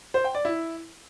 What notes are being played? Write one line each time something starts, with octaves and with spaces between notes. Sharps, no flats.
C5
G5
D5
E4